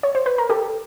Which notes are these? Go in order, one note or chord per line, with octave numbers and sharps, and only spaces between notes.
C#5
C5
B4
A#4
G4 A4